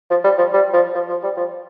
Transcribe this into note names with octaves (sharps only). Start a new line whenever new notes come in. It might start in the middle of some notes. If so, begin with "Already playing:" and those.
F3
G3
F3
G3
F3
F3
F3
G3
F3